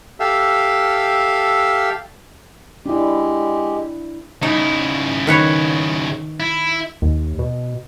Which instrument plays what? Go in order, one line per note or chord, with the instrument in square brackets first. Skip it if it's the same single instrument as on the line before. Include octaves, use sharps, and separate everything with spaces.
[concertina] G4 A4 E5 F5
[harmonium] G#3 G4 [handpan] D4 E4
[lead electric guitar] C#3 E4 [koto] D#4
[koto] D#3 B4 C#5
[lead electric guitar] E4
[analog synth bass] D#2
B2